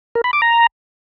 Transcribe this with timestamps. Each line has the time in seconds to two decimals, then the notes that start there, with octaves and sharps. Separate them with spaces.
0.15 A#4
0.24 B5
0.33 D6
0.42 A#5